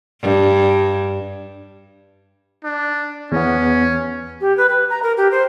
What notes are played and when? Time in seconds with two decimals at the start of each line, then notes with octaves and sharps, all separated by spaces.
0.21 G2
2.64 D4
3.32 E2 B3 C#4
4.41 G4
4.57 B4
4.69 B4
4.90 A#5
5.03 A#4
5.17 G4
5.31 C5